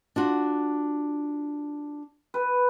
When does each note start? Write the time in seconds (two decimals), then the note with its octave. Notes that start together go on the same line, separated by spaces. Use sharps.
0.16 D4 F4 F#4
2.34 B4